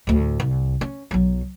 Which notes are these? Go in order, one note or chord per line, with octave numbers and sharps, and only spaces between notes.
D2 A2
C2
C#4
B1 F#3